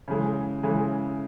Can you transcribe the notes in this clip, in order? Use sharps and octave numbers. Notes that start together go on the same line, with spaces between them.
C#3 E3 G#3
C#3 E3 G#3